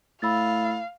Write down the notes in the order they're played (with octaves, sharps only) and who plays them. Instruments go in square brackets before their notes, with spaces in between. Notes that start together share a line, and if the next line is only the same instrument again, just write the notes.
[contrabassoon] A2 [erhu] F5 [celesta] B5 E6 A6